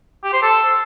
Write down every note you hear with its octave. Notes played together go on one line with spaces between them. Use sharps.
G4
C5
A4